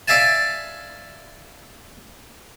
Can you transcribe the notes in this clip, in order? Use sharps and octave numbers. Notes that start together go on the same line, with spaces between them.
D5 E5 F5 G#5 A5